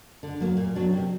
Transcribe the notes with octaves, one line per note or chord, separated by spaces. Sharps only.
D3
F#3 A#3
A#2
F#3 B3 D4
C3